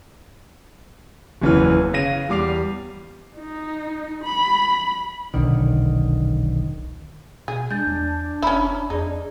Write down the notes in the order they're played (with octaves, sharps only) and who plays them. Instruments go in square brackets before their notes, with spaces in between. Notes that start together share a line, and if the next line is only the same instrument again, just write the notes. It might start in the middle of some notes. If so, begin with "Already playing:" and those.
[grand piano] F#1 E2 E3 C#4 B4 F6
C#3 F5 A#6 D#7
E2 G3 D6 C7 F7
[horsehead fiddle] D#4
B5
[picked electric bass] D#1 B1 D3 D#3
[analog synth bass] B2 [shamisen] G#4
[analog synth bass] G#3 [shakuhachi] D4 [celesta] G6 A6
[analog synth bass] E2
[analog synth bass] F#1 [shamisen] C#4 E4 [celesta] A#5 B5 E6
[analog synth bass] F2 [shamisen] D#4 [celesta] G#4 D5